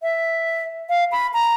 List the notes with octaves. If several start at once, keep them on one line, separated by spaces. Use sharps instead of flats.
E5
F5
B5
A#5